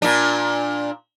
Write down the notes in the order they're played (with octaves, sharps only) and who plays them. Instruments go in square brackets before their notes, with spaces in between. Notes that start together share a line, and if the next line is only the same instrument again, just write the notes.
[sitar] A#2 D4